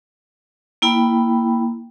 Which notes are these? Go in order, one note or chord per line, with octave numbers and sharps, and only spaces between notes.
A#3 E4 G5 B5